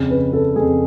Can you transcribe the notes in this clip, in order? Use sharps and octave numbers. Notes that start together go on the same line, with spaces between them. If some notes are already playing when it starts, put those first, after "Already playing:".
Already playing: F2 C#3
B4
A4
F2 C#3 G#4